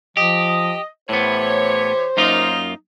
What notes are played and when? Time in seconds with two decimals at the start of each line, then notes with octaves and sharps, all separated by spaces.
0.17 F3 G4 D#5
1.09 A2 E3 B3 G4 C5 C#5
2.17 F#2 A#3 D#4 F4